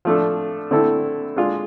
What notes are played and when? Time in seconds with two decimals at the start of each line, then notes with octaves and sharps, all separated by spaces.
0.05 F3 A3 D4 A4
0.71 D3 A3 C4 E4 A4
1.36 G#3 D4 F4